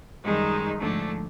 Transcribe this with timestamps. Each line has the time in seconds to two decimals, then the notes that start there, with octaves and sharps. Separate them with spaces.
0.23 F#2 D#3 G3 G#3 D#4
0.78 G#2 D3 F3 A3 D4